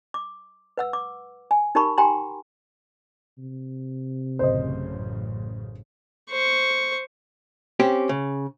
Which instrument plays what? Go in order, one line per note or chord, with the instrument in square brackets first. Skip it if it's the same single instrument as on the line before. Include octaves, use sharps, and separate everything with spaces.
[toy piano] D6
B4 F#5 E6
D6
G#5
D#4 G4 A#4 A5 B5 C#6
G4 G5 G#5 A#5 C6
[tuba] C3
[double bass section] A1 F#2 C#3 [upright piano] C5 D#5
[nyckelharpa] C5 C#6
[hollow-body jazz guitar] C4 C#4 G4
C#3